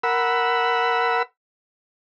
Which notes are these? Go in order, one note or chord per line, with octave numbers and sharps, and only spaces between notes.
A#4 F#5 B5 E6